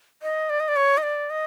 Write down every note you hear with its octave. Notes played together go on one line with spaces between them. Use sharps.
D#5
D5
D#5
D5
C#5
D#5
D5
D#5